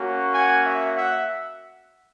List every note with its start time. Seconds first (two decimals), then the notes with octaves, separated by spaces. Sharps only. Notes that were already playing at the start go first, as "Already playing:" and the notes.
Already playing: A#3 C#4 F#4
0.32 F#5 G#5
0.64 E5 F#5
0.95 E5 F#5